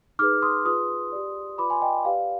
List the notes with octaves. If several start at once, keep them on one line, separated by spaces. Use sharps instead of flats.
D#4 G#4 B4 D6 F6
C6 D#6
F4 G#4 B4 C6 D#6
G4 D5
F4 B4 D5 B5 D6
G#5 C6
D#5 G5
G4 B4 D5 F5